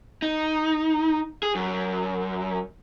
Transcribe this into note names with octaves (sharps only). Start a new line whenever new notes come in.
D#4
G#4
F#2